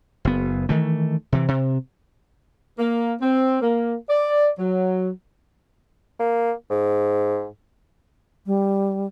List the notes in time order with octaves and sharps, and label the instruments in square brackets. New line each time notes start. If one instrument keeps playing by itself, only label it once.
[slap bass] F#1 B3
D#3 E3 A3
C3 E3
C3
[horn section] A#3
C4
A#3
D5
F#3
[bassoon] A#3
G#2
[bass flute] G3